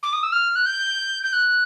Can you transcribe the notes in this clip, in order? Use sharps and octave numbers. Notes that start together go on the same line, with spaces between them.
D6
D#6
E6
F6
F#6
G6
G6
F#6